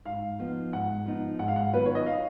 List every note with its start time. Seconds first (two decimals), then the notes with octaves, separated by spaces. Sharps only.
0.05 G#2 F5
0.39 F3 B3 D#4
0.73 G#2 F#5
1.06 F3 B3 D#4
1.39 G#2 F#5
1.48 F5
1.56 F#5
1.73 D#3 F#3 B3 F4 B4
1.85 C#5
1.95 D#5
2.06 F5